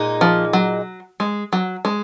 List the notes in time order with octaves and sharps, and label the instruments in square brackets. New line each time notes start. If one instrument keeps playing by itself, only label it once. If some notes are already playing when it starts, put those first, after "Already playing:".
Already playing: [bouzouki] A#2 G#3 D#4
[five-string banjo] F3
F#3
G#3
F#3
G#3